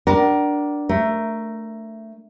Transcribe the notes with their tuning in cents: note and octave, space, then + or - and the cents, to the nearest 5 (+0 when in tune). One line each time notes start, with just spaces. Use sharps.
D4 +0 A#4 +15 F#5 +45
A3 +10 A#4 +0